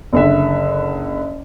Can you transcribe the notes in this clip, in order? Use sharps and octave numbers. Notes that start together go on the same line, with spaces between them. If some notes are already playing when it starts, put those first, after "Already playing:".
F#1 D3 E5